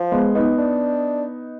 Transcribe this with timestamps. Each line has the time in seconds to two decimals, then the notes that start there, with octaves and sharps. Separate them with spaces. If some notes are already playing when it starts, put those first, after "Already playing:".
Already playing: F3
0.12 G#3 B3
0.35 B3 D#4
0.58 D4